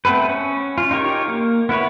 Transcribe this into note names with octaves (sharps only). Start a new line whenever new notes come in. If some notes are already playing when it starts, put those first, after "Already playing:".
A3 B3 C4 A4 B4
C#4
F4
D#4 F4 G4 A#4 C#5
A#3
B3 E4 B4 C#5